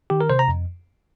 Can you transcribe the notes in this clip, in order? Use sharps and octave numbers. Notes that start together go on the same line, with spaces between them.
D#3 G4
A#4
C3 C5
A#5
F2